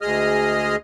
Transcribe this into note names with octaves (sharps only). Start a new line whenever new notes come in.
D2 G#3 G#4 D#5 D#6 F6